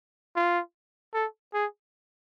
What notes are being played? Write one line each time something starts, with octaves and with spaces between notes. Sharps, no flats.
F4
A4
G#4